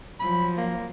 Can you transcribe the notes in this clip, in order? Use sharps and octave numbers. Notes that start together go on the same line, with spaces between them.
F3 F#3 B5
A#3